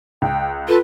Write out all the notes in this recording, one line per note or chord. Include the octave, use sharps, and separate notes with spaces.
C#2 G5
F4 A4 B4